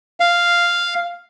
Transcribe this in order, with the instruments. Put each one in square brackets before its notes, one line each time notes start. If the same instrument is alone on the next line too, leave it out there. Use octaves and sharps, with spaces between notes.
[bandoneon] F5